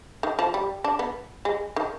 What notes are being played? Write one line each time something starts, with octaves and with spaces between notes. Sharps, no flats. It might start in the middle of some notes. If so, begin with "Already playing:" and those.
D#3
F3
G3
D4
B3
G#3
D#3